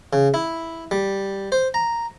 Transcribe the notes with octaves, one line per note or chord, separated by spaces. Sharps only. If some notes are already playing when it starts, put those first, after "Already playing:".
C#3
E4
G3
C5
A#5